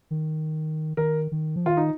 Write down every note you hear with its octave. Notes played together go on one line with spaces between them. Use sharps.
D#3
D#3 A#4
D#3
F3
D#3 F4
D#4